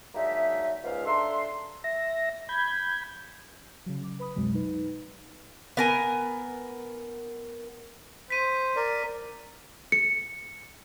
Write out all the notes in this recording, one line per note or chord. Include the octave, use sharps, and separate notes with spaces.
F#3 G#3 A#3 D4 D#4 E5
C#2 G#2 F5
D4 A4 E5 A#5 C6
E5 A#6
B5 G6 G#6
C#3 F#3
D6
B4 B5 D#6
B1 F2 B2 F#3 G#3
D#4 B4
B3 A#4 G#5
C5 B6 D#7
A#4 D5
C#7